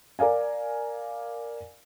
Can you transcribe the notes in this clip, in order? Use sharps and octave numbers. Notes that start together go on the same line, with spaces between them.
A#4 D5 F5 G#5